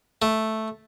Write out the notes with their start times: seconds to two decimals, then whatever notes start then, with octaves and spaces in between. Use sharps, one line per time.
0.22 A3